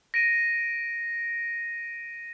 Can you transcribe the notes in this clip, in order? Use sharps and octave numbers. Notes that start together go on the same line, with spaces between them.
A#6 D7 D#7